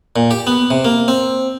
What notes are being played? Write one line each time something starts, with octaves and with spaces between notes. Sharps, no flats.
A#2
G4
B3
C3
A#3
C4